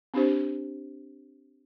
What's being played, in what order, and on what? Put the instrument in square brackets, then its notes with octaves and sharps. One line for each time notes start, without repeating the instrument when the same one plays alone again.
[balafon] C4 D4 G4 C5